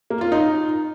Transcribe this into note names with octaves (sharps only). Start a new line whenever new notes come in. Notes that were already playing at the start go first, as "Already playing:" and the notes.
A#3
F4
D#4